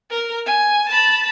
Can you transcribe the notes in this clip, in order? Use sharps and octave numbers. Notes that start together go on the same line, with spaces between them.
A#4
G#5
A5 B5